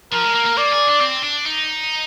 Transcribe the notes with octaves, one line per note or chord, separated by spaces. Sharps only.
F3 A#4
G#3
A#3
A#3
A#3 D5
G#4
D4
C4
D4
D#4